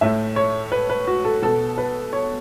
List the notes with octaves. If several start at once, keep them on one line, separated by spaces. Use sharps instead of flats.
A2 A3 E5
C#5
B4
B4
F#4
A4
B2 B3 A4
B4
C#5